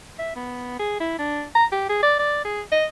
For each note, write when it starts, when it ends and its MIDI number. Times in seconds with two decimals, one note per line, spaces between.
0.19 0.33 76
0.36 0.74 59
0.79 0.97 68
1.00 1.16 64
1.19 1.44 62
1.55 1.65 82
1.72 1.89 67
1.89 2.02 68
2.03 2.14 74
2.19 2.43 74
2.45 2.61 68
2.72 2.85 75